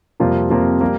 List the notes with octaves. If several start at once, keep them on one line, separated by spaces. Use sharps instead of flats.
F2 C3 G3 A#3 F4
F2 C3 G3 A#3 F4
G3 A#3